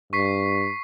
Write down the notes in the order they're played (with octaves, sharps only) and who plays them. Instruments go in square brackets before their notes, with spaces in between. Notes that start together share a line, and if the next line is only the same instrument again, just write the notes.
[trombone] G2 [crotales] C#6 B6 C7